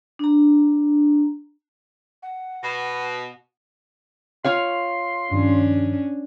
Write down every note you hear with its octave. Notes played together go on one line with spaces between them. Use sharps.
D4 A#5
F#5
B2 A#6
F4 C#5 F5 C6
G2 D#3 F3 C#4 D4